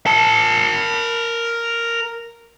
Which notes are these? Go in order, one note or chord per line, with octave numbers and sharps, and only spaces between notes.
A#4 A5